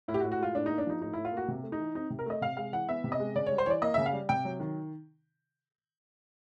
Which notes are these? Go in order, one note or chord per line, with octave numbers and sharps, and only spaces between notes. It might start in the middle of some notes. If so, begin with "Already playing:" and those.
A2 E4
G4
F#4
A2
F#4
G#3 F4
A2 D4
A#3 D#4
D4
F3 D#4
A2 D#4
A2 E4
F4
A#3 F#4
C3
A3
D#4
E3
C4 D#4
C3
A#4
A3 D#5
C3 F5
G#3 F5
E3 F#5
B3 E5
C3
D#5
G#3
C#3 D5
G3 C#5
C5
E3 C#5 D5
A#3 D#5
C#3 E5
F5
G3
C3 G5
F#3
D#3